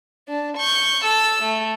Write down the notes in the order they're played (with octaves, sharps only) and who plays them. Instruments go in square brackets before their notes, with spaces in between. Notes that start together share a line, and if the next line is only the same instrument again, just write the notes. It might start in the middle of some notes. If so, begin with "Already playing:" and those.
[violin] D4
C#6 G6
A4 E6
A3